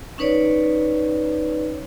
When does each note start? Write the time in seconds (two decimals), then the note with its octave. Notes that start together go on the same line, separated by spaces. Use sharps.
0.18 C#4 D#4 B4 C#5 D5